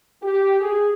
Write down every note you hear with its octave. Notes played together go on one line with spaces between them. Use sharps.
G4
G#4